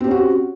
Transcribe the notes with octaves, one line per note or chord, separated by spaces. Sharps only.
C4 C#4 F#4 G4